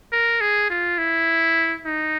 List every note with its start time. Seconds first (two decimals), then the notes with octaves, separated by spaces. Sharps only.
0.12 A#4
0.40 G#4
0.70 F4
0.98 E4
1.85 D#4